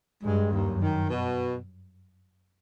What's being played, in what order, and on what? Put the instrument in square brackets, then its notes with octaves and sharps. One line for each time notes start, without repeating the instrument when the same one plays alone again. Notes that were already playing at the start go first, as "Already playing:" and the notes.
[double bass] G2 [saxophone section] G#3
[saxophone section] D#2
[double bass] F#2
[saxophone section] D#3
B2